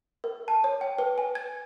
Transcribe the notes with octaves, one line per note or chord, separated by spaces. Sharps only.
A#4
A5
C#5
G5
B4
G#5
G#6